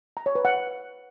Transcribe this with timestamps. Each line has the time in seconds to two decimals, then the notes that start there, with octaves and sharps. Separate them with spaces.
0.17 A#5
0.26 C#5
0.35 B4
0.45 F#5